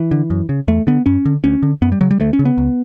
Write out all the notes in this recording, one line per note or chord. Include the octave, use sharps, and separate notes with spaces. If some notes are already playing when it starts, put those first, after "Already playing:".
Already playing: E3
D3
F#2
C#3
E2 A3
D3 B3
F#2 C#4
D3
D2 C#4
D3
F#2 B3
G3
C#3 F#3
G3
D2 A3
C#4
C#3
B3
C#2